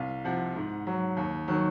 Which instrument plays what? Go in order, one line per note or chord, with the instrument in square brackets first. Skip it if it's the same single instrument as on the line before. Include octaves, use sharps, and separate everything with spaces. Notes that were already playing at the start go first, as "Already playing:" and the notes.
Already playing: [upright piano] C2 F5
C3 F3 F#5
G#2
F#3
D#2
D#3 F#3